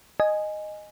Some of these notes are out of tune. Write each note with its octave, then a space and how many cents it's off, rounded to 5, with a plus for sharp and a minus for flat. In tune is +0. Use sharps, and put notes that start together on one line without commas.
D#5 -10 G#5 +0